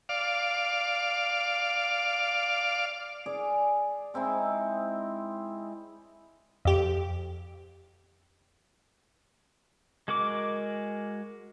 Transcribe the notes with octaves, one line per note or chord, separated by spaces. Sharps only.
D5 F5
G#4 D5 G#5
G#3 C4 D#4 E4
F2 G4
G#3 F#4 A#4 D6